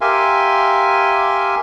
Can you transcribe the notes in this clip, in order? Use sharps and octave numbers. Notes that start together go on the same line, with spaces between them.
G4 A#4 E5 F5 G#5 C6